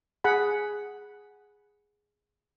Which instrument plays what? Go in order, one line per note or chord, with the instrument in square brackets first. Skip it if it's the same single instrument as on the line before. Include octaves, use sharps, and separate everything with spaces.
[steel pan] G#4 F#5 B5